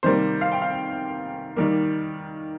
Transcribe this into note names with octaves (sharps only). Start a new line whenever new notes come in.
C3 D#3 G3 A#3 C5
F5
G5
F5
D#3 G3 A#3